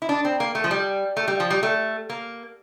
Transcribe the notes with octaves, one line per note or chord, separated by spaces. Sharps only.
E4
D4
C4
A#3
A3
F3
G3
A3
G3
F3
G3
A3
A#3